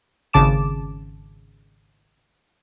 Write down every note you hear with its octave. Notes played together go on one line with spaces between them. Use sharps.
G#1 C#3 A5 D6 E7